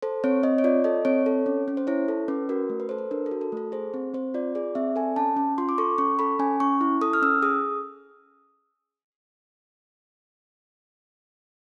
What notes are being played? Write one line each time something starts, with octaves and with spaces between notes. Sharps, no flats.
A4 C5
C4 C#5
C4 D#5
C#5
F4 D5
A4 D#5
C4 C#5
A4
C#4
C#4
C5
E4 C#5
A4
C#4 B4
F#4 A#4
A3
B4
A4 C5
B4
D4 A#4
A4
F#4
A4
A3 A4
G#4 C5
C4
C4 C5
F4 D5
G#4 D5
C4 E5
A4 G#5
C#4 A5
C#4
F4 C6
D6
A4 C#6
C#4 C#6
A4 B5
C#4 G#5
C#4 C#6
E4
A4 D#6
F6
C#4 E6
G#4 D#6